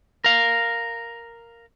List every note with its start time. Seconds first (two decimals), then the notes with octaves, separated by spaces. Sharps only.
0.24 A#4 F5